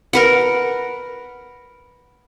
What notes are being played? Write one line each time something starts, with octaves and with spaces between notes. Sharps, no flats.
A#4 B4 F#5